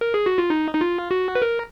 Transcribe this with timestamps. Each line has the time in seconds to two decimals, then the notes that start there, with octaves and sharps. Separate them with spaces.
0.01 A#4
0.14 G#4
0.26 F#4
0.38 F4
0.50 D#4
0.74 D#4
0.81 F4
1.11 F#4
1.35 B4
1.42 A#4